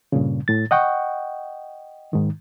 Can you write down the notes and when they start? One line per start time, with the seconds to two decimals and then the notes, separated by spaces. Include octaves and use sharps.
0.12 G2 A#2 C#3
0.48 A2 A6
0.71 D#5 F#5 G5 C#6
2.13 G#2 D#3